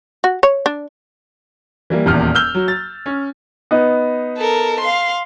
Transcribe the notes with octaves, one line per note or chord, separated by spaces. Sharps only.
F#4
C#5
D4
E3 G3 A#3
D#1 E2 A#2 F6
E6 F6 G6 G7
F#3
A6
C#4
B3 D#4
A4 A#4
F5 C6